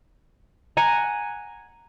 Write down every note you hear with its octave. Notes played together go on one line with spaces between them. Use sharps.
F#5 G#5 A#5